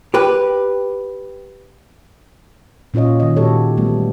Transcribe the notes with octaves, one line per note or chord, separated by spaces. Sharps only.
G4 B4
A#2 C#4 F4 C#5 D#5
D#3 D#5
A#2 G#3 F#4 G4 A4 C#5
E3 G3 A3 B3